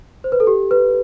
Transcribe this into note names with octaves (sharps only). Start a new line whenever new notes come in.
C5
B4
A4
G4
B4